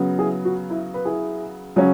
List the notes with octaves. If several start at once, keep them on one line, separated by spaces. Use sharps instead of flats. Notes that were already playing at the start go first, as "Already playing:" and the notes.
Already playing: C#3 F#3 B3
E4 G#4
F#4
E4
B4
E4 G#4
C#3 F#3 C#4